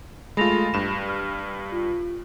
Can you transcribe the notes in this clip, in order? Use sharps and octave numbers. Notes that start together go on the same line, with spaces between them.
G#3 A3 F4 B5 A#6 F7
G2 E7
F6
F4